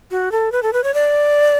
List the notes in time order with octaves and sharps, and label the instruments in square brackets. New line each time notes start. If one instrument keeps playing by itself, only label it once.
[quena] F#4
A4
B4
A4
B4
C#5
D5